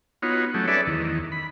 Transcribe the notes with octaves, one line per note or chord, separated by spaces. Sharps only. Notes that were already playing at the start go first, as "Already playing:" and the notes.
B3 D#4 F4 F#4 C#5
F#3 A3 C#4 G4
G#4 A4 B4 C#5 D5 E5
E2 D#3
B5